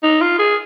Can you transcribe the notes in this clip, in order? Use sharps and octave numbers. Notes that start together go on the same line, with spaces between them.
D#4
F4
G#4